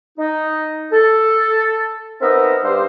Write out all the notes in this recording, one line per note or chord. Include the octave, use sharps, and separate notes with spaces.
D#4
A4
B3 C4 D#4 A#4 D#5 E5
G2 G4 C5